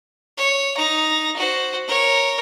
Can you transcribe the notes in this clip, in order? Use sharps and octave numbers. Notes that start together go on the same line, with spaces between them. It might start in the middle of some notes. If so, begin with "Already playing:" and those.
C#5
D#4 A#5
F#4 C5
A#4 C#5